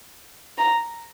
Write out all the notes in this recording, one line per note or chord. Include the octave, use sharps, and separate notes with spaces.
A#5